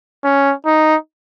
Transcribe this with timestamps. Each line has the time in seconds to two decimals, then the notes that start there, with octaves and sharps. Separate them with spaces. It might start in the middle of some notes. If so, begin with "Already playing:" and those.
0.24 C#4
0.66 D#4